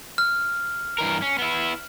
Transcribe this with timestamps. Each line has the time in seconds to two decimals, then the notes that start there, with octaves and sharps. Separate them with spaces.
0.18 F6
0.98 G2 E3 A#4
1.22 C#4
1.38 B3 E4